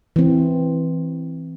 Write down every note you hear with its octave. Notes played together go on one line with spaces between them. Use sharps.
E3 C4